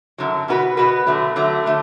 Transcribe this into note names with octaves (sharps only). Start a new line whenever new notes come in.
F#2 D3 F#3
B2 B3 F#4 B4
B2 B3 F#4 B4
D3 F#3 A3
D3 F#3 A3
D3 A3